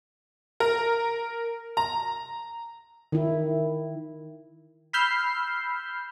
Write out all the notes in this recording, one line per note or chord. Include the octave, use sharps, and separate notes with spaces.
A#4
A#5
D#3 E4
B5 E6 F6 G6 C7